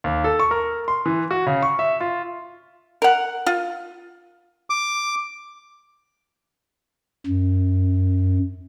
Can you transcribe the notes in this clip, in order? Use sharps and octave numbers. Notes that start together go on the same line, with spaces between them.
D#2
A4
C#6
A#4
C6
E3
F#4
C#3
C#6
E5
F4
A#4 F#5
F4
D6
F#2